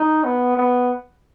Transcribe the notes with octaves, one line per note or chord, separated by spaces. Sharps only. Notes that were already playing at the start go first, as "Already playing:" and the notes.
Already playing: D#4
B3
B3